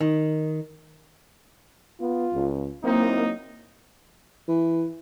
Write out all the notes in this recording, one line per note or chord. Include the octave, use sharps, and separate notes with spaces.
D#3
B3 F4
C#2
F#3 A#3 C4 D#4 E4
E3